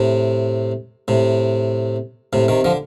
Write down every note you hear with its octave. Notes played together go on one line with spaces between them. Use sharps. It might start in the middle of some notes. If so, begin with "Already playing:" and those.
Already playing: A2 C3
A2 C3
A2 C3
C3 D#3
D3 F3